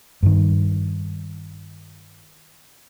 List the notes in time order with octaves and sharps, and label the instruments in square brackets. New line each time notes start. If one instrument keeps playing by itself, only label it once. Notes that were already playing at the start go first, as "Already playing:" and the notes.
[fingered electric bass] G2 D#3